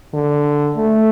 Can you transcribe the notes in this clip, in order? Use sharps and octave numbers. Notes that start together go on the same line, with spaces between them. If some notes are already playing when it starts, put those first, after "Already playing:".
D3
A3